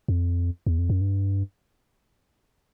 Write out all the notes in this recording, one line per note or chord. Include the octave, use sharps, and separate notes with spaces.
F2
E2
F2
F#2
G2